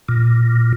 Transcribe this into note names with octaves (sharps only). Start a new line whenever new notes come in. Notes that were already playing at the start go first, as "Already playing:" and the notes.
A#2